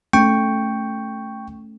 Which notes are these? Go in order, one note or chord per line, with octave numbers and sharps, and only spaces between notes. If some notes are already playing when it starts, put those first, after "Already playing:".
A3 C#4 G5 C#6